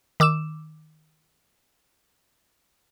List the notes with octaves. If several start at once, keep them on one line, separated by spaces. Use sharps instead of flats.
D#3 D6 E6 E7